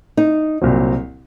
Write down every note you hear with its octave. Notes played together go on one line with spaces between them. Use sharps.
D#4
C2 A#2 F#3 C4